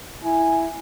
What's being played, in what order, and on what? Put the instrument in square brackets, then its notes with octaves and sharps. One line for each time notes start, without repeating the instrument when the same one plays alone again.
[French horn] E4 [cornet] G#5